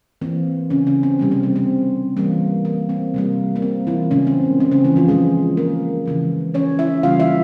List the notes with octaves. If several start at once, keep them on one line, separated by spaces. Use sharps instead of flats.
E3 A#3 C4
C#3 C#4
C#3 C#4
C4
C3 G3 A#3 C4
C4
C4
C4
E3 G3 A#3
A#3
C4
C3 G3 A#3
A#3
C4
E3 E4
A#2 C#3 G#3 C#4
C4
A#3
C4
C#3 C#4
E3 E4
F3 F4
A#2 F3 G#3 G#4
A#3 A#4
C#3 E3 G#3
C#4 C#5
E4 E5
C#3 E3 G3 A#3 F4 F5
E4 E5